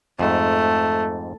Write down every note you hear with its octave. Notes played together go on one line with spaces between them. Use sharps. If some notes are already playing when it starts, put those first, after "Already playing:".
F2 G#2 A3